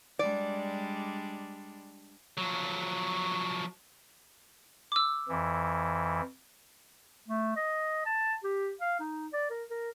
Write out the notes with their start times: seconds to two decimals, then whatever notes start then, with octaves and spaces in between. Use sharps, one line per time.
0.19 G3 G#3 D4 D5
2.37 F3 F#3
4.92 D6 E6
5.29 F2 E3
7.28 A3
7.56 D#5
8.05 A5
8.43 G4
8.81 F5
8.99 D#4
9.33 D5
9.50 A#4
9.70 A#4